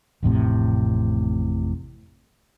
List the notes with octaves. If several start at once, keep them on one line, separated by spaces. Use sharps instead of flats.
A1 F2 A2 C3